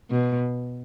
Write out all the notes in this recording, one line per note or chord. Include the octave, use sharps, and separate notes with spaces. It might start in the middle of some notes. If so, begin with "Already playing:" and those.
B2